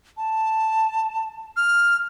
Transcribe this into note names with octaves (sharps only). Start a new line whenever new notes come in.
A5
F6